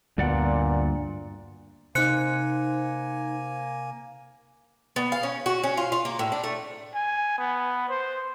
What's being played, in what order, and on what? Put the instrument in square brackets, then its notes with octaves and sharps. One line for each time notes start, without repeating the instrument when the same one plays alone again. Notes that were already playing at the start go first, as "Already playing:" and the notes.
[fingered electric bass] D2 B3 [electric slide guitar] G2 D5 F#5 [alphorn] A#2
[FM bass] C3 [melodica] A#3 G#5 [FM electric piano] D#4 C5 [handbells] F#6 C#7
[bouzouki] B3
F5
C#4
F#4
C#4
F4
F4
A#3
A2
D4
A3
[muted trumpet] G#5
B3
C5